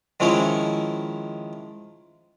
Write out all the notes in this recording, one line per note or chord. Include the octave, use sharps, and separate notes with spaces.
D#3 F3 G#3 C#4 E4 C#5